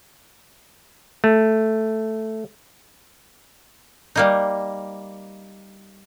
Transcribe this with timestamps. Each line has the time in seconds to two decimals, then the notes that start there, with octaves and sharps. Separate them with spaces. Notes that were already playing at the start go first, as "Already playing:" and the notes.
1.24 A3
4.16 G3 A#3 D#4